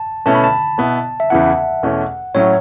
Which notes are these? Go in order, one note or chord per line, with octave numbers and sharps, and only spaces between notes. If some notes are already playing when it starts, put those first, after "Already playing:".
Already playing: A5
B2 A3 C#4 E4 A5
B5
A5
B2 B3 E4
E5
E2 C#3 E3 B3 E4 F#5
E2 B2 A3 C#4 E4
A2 F#3 C#4 E4 C#5